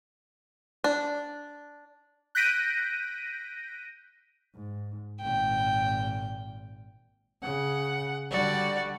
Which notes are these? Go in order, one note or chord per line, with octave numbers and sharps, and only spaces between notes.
D4
F#6 G6 A#6 B6 D7 D#7
G#2
G#1 A#2 G5
C#3 F#5
D3 G3 F#4 D5